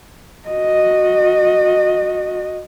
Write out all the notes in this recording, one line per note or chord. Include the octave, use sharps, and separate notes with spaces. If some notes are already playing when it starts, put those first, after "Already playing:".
F#4 D#5